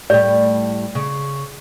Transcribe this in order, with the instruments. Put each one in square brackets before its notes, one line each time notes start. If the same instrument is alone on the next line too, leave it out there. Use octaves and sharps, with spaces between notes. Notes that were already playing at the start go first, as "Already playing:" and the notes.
[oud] A2 G3 [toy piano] D5
[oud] C#3